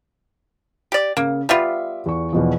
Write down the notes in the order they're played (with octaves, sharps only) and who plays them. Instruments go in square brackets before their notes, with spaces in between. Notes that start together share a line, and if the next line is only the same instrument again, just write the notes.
[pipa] G4 D5
[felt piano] C#3 [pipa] A#3
[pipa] G3 B3 F4 [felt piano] E5 D6
[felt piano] E2 C#6
E2 B2 F3